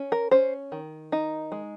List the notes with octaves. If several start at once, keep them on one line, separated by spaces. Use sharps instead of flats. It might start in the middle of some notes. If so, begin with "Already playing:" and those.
Already playing: C#4
A#4
C#4 C5
D#3
D#4
G#3